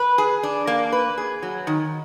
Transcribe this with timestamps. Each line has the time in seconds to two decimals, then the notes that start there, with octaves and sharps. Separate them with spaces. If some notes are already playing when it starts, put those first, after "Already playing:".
Already playing: B4
0.18 G#4
0.43 D4
0.67 A#3
0.92 B4
1.18 G#4
1.43 F#3
1.67 D#3